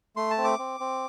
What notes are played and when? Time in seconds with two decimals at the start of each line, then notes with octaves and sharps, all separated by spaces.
0.16 A3 C6
0.31 A5
0.38 C4
0.45 D6
0.59 C4
0.80 C4